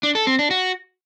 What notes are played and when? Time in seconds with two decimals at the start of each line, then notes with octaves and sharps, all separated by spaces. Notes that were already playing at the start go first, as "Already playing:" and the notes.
0.03 D4
0.15 A4
0.27 C4
0.39 D4
0.51 F#4